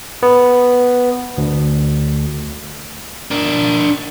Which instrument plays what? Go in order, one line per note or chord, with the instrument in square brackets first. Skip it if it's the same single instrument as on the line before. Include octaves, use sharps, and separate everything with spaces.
[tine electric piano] B3
D2
[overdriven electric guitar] D4 A#4